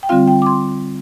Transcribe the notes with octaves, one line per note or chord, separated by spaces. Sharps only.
G5
D3 G3 C4 F4 F5
G5
D6
C6